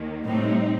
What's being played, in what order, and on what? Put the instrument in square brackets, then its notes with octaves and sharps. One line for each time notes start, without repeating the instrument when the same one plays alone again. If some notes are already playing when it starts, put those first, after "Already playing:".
Already playing: [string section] D#2 D#3 A#3
[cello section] A2 [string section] C3 G3 C4 D#4